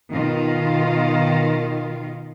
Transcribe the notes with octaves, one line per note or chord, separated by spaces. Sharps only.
B2 D#3 F4